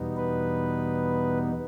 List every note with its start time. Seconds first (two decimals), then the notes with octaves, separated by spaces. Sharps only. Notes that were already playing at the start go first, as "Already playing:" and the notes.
Already playing: E2 B2 G3 B3 D#4
0.17 B4